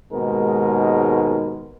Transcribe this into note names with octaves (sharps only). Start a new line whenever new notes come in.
D#2 G#2 B2 G#3 A#4